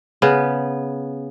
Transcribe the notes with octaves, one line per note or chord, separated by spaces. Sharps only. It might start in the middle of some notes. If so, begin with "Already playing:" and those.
C#3 B3